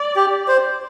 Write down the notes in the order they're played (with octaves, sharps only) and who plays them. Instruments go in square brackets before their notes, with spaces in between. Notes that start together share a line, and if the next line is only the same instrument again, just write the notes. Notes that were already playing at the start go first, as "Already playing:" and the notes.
Already playing: [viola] D5
[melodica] G4
C5